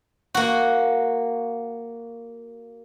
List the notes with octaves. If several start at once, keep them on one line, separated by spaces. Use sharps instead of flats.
A#3 F#4